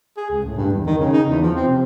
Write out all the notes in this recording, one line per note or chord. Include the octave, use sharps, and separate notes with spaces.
G#4
C#2
A2
G2
E2
D#3
C#3
D#4
E2
F3
C4
C3